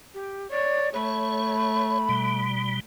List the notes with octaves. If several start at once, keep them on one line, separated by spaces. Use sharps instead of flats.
G4
C#5 D5
A3 C#5 B5
B2 G3